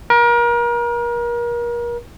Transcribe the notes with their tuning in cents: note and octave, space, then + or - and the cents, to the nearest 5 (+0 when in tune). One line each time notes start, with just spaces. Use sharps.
A#4 +35